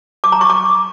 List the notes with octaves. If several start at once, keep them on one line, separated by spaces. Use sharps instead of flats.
D6
A#5
C#6
D6